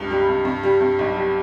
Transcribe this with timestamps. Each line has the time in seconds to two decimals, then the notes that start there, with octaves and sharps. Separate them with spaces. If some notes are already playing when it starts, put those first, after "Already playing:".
Already playing: C#2 G2
0.10 G3
0.27 G2
0.45 G2
0.63 G3
0.81 G2
0.99 B1
1.17 G3